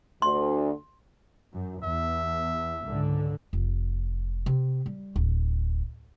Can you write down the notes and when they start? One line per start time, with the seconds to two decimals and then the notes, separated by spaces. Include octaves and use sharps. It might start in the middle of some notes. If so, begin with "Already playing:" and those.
0.22 D2 C6
1.53 F#2
1.84 E2 E5
2.88 C#2 G#2 D3
3.53 F1
4.46 C3
4.86 G3
5.16 D1